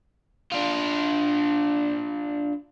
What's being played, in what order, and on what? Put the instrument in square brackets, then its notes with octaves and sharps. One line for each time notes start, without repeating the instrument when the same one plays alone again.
[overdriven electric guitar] D4 F4